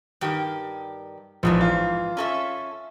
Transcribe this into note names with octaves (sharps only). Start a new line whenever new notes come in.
G2 D#3 G4
A#1 F2 G#2 E3
F4
C#4 A4 E5